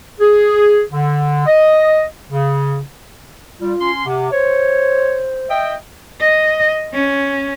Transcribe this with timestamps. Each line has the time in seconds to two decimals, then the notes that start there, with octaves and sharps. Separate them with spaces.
0.19 G#4
0.91 D3
1.46 D#5
2.30 C#3
3.60 G3 F4
3.80 C#4 C6
4.06 C3 F#5
4.32 C5 C#5
5.49 D#5 E5 G5
6.20 D#5
6.94 C#4